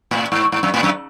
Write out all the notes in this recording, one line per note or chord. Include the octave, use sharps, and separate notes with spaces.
A2
G#2
G#2
F#2
A2
F#2